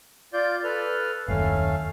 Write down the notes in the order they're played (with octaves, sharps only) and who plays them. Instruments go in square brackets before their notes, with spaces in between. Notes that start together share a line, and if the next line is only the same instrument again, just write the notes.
[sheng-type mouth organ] F4 D5 G6
A4 B4 F6
[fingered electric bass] F#1 D#2 [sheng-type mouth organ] A3 C#4 F5